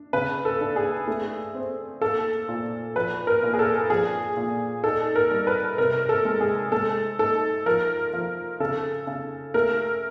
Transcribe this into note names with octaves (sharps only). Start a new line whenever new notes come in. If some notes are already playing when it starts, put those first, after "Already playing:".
Already playing: D4
C#3 B4
A4
D4
G#4
A3
C4
A#3 A4
A#2
F3 B4
A#4
A#2
G#4
A4
F3 G#4
A#2
D#4 A4
A#4
G3
B4
C3 A#4
A4
G#3
G#4
G#3 A4
D#4 A4
F3 A#4
F3
C#3 A4
C#3
A3 A#4